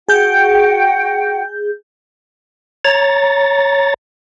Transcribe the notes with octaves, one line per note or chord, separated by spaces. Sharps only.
F#4 G#4 F#5 G5 G6
C#5 A#5 A6